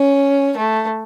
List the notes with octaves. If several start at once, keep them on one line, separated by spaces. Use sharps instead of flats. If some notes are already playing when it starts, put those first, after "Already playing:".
Already playing: C#4
A3